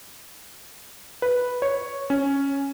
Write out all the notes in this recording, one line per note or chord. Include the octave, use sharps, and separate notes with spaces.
B4
C#5
C#4